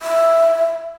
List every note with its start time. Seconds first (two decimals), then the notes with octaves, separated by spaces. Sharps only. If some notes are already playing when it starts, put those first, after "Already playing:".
0.02 E5